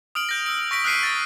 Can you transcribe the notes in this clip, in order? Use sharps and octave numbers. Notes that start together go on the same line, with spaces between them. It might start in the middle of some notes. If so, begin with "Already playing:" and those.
D#6 F6 D7 F#7
G6 A#6
E6 D7
C#6 A#6 B6 D7
D#6 F6 F#6 B6 C7 D#7
A6 A#6